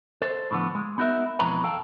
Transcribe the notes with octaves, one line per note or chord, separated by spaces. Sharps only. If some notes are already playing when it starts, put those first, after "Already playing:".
A4 C5
A2 D3 F3 B3
G#3
B3 D#4 F#4 A#4 E5
F2 B2 E3 G#3 B4 A#5
A4 F5 G5 A5